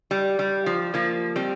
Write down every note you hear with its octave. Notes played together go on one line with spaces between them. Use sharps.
G3
G3
F3
F3 A#3
G3 C4